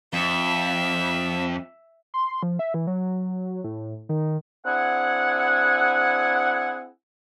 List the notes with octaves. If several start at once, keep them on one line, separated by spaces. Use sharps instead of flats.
F2 E5
C6
F3
E5
E3
F#3
A2
D#3
C4 D4 E4 G#4 F#5